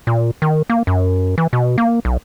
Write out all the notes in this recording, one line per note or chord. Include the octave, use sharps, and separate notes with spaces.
A#2
D#3
A#3
F#2
E3
B2
A#3
B1